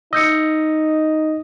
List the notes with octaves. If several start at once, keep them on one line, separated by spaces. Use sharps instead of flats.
D#4 D#5 E6 G6 C#7